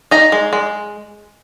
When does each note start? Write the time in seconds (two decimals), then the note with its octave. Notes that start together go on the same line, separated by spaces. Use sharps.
0.11 D#4 A#5
0.32 G#3
0.53 G#3